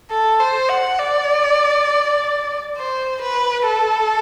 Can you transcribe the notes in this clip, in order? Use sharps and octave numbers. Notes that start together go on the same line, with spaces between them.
A4
C5
F#5
D5
C5
B4
A4